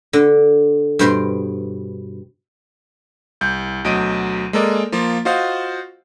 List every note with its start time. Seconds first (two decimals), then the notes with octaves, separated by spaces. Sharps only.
0.13 D3
0.99 G2 B2 C5 G5 C6
3.41 C2 G6
3.84 D2 B2 F#3 D#5 D7 D#7
4.53 G#3 A#3 A4 A#4 D5 D#5
4.92 F3 A#3 F4
5.25 F4 F#4 C5 D#5 F5